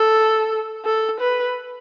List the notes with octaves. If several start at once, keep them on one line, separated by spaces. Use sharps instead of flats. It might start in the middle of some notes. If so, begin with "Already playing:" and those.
Already playing: A4
A4
B4